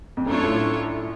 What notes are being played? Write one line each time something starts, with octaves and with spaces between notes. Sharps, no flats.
F2
F#2 A3 D4 F4 A4 C#5
A2